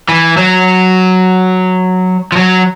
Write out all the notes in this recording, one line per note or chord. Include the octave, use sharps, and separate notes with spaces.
E3
F#3
F3
F#3